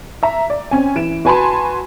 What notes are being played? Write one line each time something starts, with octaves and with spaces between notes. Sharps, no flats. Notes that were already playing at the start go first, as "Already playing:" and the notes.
E5 A#5
D5
C4 C#4 G#5
E3 D7 E7
F#4 B4 G#5 A5 B5 C6